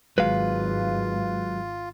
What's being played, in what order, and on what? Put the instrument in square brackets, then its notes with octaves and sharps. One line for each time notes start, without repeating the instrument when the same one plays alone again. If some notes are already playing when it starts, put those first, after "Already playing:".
[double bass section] G#1 [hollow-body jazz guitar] F#3 G#3 [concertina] F4 [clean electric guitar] B4 F5